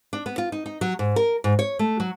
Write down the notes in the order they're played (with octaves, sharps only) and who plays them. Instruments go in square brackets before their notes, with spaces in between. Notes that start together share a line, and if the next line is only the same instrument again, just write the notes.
[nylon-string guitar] D4
B3
F4
D#4
D#4
F#3
G#2
A#4
G#2
C#5
A3
F#3